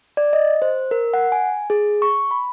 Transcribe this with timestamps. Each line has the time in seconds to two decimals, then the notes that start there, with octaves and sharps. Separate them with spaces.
0.17 D5
0.33 D#5
0.62 C5
0.91 A#4
1.14 F#5
1.32 G#5
1.70 G#4
2.02 C#6
2.31 B5